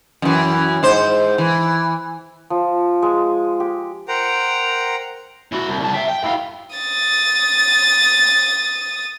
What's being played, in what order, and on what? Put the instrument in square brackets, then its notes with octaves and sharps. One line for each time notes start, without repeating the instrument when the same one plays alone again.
[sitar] F#2 E3
G#2 C5
E3
[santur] F3
G#3
G4
[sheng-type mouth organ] A#4 C5 F#5 G5 A#5
[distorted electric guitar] E4 F#4
C2
C2 A5
E5 G5
G5
E4 F5
[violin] D#6 A6